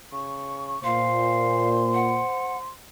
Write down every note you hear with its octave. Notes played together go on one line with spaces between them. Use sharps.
C#3 C#6
A#2 C5 F5 C6
F#5